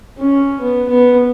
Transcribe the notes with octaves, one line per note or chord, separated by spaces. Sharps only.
C#4
B3
B3